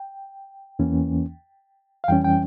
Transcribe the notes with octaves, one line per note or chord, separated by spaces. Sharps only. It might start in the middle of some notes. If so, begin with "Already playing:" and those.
Already playing: G5
E2 E3 A#3 C#4
F5
F2 E3 G3 C#4 G5
G5